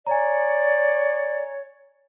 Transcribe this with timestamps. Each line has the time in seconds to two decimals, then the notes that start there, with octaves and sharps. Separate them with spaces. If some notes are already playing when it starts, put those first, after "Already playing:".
0.07 C#5 D5 G#5 A#5